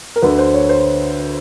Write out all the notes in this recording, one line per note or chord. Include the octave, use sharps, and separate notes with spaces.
A#4
D2 D3 B4
C5
C#5
C5